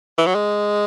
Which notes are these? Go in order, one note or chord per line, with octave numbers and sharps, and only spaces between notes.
E3
F#3
G#3